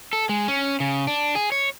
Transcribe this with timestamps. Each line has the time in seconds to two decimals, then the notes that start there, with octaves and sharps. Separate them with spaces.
0.13 A4
0.29 G#3
0.48 C#4
0.80 C#3
1.07 D4
1.35 G#4
1.52 C#5